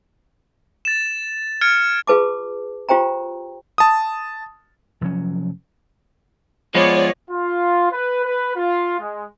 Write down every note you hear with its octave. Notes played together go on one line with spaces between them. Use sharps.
A6 E7
F6 G#6 C#7 D7
F4 G#4 B4 A5 D6
F4 G4 C5 G5 A#5
A5 D#6
F1 F3 F#3 C#4
F3 G#3 B3 C#5 D5
F4
B4
B4
F4
G#3